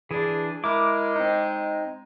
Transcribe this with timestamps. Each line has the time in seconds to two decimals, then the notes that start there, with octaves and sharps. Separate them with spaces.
0.11 E3 D4 G#4
0.64 G#3 E4 A#4 D6
1.16 C4 D#4